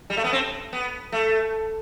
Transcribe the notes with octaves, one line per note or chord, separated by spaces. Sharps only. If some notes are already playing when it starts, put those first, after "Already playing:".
G3
A3
B3
C4
B3
A3